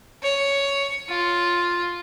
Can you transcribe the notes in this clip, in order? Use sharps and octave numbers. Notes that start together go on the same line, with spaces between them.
C#5
F4